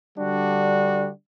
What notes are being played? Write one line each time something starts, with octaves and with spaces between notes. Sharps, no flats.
D3 G3 D4 F#4